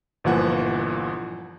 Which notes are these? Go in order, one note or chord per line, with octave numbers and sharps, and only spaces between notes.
G1 A#2 E3 F3 F#5